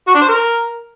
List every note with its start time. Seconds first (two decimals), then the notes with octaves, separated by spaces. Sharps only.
0.08 F#4
0.15 D4
0.22 C5
0.28 A#4